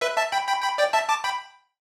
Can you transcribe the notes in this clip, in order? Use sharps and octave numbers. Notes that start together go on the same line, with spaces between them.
B4 E5
E5 A5
G5 B5
G5 B5
G5 B5
D5 G5
E5 A5
A5 D6
G5 B5